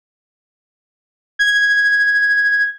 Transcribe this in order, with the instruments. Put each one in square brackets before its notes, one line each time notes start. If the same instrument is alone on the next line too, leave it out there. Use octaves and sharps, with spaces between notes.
[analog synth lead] G#6